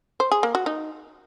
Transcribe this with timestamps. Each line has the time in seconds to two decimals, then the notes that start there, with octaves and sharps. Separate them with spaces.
0.20 C5
0.32 G#4
0.43 A#3
0.55 F#4
0.66 D#4